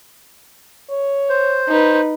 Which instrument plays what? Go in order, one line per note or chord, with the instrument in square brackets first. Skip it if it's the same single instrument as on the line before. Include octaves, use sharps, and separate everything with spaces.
[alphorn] C#5
[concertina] C5
[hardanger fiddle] D#4 B4